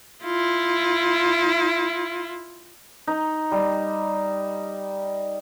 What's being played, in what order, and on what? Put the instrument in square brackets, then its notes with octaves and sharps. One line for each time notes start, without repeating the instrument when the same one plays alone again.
[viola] E4 F4
[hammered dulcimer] D#4
G3